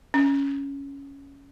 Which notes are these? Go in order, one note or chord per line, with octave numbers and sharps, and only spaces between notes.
C#4